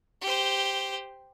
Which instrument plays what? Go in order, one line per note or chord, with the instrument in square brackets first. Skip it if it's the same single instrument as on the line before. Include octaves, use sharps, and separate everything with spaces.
[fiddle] G4 C5